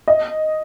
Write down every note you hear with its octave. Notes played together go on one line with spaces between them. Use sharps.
D#5